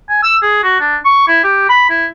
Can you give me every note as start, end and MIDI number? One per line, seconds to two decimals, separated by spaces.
0.09 0.22 80
0.23 0.36 88
0.42 0.62 68
0.63 0.77 66
0.80 0.97 62
1.05 1.23 85
1.28 1.40 64
1.44 1.66 67
1.69 1.85 83
1.90 2.06 64